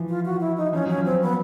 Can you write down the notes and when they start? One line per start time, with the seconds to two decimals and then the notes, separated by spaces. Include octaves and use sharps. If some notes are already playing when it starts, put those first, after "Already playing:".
Already playing: E3 F3
0.09 F4
0.25 F#4
0.41 E4
0.57 D#4
0.73 F3 C#4
0.86 F#3 C#4
0.98 F3
1.05 C4
1.22 B3